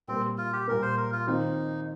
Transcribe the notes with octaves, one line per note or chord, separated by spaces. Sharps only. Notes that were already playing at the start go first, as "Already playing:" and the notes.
A#2 G3 A#3 C4
F4
G4
A#2 G3 A#3 A#4
C5
A#4
F4
D#3 C4 D#4 F4